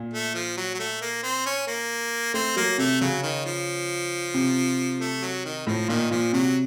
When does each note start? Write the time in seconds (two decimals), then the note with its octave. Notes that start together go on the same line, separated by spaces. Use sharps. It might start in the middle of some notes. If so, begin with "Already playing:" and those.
Already playing: A#2
0.13 A3
0.35 F3
0.57 F#3
0.74 F#3
0.79 A3
1.01 A#3
1.23 C4
1.46 C#4
1.67 A#3
2.34 A3 C4
2.56 F#3 A#3
2.78 C3 A3
3.01 C#3 F#3
3.23 D#3
3.45 F3
4.34 C3
5.01 A3
5.22 F#3
5.45 D#3
5.67 A2 F3
5.88 A#2 D#3
6.11 A#2 F3
6.33 C3 F#3